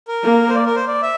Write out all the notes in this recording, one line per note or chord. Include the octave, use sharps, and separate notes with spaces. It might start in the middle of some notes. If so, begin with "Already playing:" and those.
A#4
A#3
C5
D5
A#4
C5
D5
E5